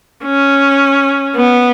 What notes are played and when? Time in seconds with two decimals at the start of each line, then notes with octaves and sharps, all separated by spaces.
0.25 C#4
1.35 B3